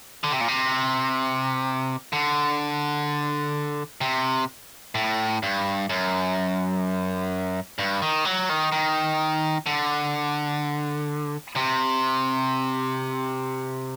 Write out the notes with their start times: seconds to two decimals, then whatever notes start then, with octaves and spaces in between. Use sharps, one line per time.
0.24 D3
0.32 C3
0.41 A#2
0.48 C3
2.13 D3
4.01 C3
4.95 A2
5.43 G2
5.90 F#2
7.79 G2
8.02 D#3
8.25 F#3
8.49 D#3
8.72 D#3
9.66 D3
11.56 C3